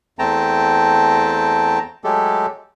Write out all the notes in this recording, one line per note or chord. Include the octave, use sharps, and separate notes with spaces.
E2 A3 C4 G5 A5 A#5
F#3 G#3 A3 G4 A4